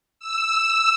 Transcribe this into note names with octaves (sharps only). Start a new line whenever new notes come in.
E6